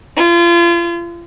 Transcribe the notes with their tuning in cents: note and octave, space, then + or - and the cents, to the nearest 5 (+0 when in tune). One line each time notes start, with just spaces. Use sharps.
F4 -35